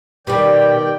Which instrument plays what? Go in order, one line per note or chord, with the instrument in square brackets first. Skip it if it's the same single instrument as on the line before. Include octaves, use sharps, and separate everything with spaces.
[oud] B2 G3 [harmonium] D#3 D5 G5 [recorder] G4